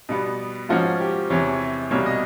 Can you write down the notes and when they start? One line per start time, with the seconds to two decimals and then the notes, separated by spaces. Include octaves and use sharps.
0.09 B2 G3 B3
0.69 G#2 F3 A#3 C#4 F#4
1.00 G4
1.30 E2 C3 E3 C#5
1.91 C2 B2 G3 A#3 C#5
2.06 D#5